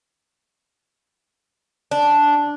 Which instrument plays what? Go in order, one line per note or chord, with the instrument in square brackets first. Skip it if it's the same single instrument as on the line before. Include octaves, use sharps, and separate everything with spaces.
[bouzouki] D4